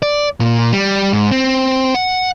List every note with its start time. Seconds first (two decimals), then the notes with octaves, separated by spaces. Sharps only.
0.02 D5
0.40 A#2
0.73 G3
1.13 G#2
1.31 C4
1.94 F#5